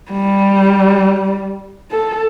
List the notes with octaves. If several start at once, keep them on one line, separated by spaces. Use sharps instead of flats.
G3
A4